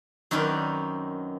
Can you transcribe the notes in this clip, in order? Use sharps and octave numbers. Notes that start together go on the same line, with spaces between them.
F#2 D#3 C4 C#4 B4 D5